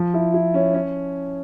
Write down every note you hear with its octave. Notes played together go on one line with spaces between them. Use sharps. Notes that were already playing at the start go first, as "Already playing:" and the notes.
Already playing: F3
E4
E4
C#4
C#4